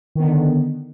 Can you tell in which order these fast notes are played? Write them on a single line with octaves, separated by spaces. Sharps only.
D#3 B3 D3